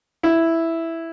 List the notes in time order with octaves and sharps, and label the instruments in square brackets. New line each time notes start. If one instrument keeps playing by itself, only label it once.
[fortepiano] E4